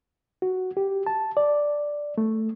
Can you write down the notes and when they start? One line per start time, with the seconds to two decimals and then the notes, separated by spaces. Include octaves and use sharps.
0.42 F#4
0.77 G4
1.06 A5
1.37 D5
2.18 A3